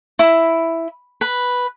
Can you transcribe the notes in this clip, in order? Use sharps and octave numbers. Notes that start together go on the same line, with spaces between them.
E4
B4